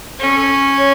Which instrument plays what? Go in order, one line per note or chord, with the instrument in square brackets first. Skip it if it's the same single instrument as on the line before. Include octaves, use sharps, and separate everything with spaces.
[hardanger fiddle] C#4 [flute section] A4
[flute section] C#5